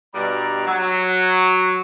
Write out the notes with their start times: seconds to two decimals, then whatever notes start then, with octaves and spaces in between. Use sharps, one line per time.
0.14 G2 B2 G3 D5 A#5
0.66 F#3